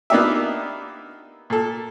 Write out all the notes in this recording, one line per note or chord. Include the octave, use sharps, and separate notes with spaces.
A#3 B3 D4 D#4 G4 E5
A#2 A4